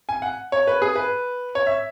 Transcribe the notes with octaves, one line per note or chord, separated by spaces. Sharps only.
G#5
F#5
C#5
B4
G#4
B4
C#5
E5